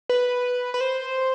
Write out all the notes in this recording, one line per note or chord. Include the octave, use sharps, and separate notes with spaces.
B4
B4
C5